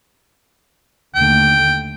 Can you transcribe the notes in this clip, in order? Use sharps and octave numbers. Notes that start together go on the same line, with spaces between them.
D#2 D3 A3 G5